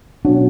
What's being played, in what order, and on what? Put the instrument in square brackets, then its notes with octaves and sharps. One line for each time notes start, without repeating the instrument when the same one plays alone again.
[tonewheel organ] B2 F#3 C#4 F#4 [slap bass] D4